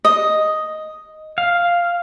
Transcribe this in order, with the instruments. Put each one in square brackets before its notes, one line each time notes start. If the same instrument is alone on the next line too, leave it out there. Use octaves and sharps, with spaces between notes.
[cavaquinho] D#5
[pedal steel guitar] F5